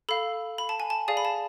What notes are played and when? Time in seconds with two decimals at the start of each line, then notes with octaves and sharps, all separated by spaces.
0.09 A4 F5 B5
0.58 B5
0.69 A5
0.80 G#5
0.90 A5
1.08 G#4 D5 F5 G#5
1.17 B5
1.25 A5